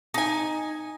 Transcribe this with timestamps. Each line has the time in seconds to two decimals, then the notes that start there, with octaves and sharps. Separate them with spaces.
0.14 D#4 G#5